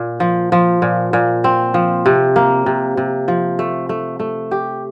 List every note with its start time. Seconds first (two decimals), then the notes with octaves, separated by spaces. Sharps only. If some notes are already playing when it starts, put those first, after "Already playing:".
Already playing: A#2
0.20 F3
0.52 F3
0.82 A#2
1.13 A#2
1.44 C4
1.74 F3
2.06 C3
2.36 A#3
2.66 C3
2.97 C3
3.28 F3
3.59 A3
3.89 A3
4.19 A3
4.51 G4